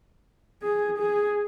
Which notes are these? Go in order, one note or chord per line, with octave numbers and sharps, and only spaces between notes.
G#4
G#4